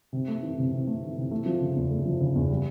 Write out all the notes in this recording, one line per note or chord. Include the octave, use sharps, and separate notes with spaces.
C3
A3
E3
C3
C3
A3
E3
C3
A3
F3
C#3
E2
A3
F3
C#3
E2
G3